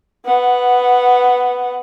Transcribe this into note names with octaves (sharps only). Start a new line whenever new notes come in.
B3 F#5